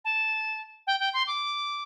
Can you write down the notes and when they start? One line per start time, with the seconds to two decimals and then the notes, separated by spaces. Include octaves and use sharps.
0.04 A5
0.87 G5
1.00 G5
1.13 C6
1.27 D6